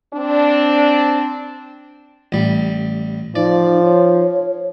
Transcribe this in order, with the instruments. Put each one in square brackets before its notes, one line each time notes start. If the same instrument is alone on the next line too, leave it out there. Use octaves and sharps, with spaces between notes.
[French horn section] C4 D4
[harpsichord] A1 G3
[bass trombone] F3 [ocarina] D#4 [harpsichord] D5
[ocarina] C#5